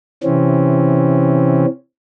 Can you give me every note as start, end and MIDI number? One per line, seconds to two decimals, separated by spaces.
0.24 1.66 48
0.24 1.66 52
0.24 1.66 60
0.24 1.66 61